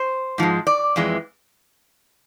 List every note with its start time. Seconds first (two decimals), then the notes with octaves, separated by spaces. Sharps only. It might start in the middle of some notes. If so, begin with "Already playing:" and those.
Already playing: C5
0.38 G#2 F3 G#3
0.67 D5
0.96 F2 E3 G#3